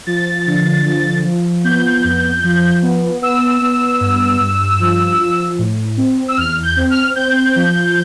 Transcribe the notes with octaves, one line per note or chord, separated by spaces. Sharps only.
F3 A6
D3
F3
F3
B3 G6
F2
F3
B3
B3 E6
B3
G2
G2
F3
F3
A2
C4
E6
E2 F6
G6
C4
F6
C4 G6
F3